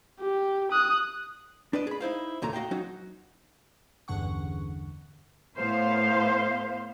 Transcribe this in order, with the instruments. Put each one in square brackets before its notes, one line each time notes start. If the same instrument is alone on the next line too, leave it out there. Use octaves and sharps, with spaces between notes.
[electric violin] G4
D#6 F#6
[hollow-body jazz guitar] D4 B4 D5 D#5
G#4 B5
D#4 E4 C5 F5
D#2 A#2 C#3 A3 A#5
F#4 D#5 F5 G5
F#3 C#4 D#4 F#4
[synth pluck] A1 E2 G2 D3 F#5 C#6
[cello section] A2 B3 C5 F5